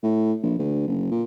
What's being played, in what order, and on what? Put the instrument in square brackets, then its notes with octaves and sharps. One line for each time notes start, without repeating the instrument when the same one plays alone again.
[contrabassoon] A2
A#1
D2
F#1
A#2